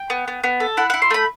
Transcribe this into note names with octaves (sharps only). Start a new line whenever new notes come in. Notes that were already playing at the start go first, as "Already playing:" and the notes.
Already playing: G5
B3
B3
B3
A4
E4 F#5
E4 F#5
C6
A3 B5